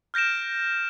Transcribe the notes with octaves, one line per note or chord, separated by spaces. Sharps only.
F6 G6 A#6 D7 E7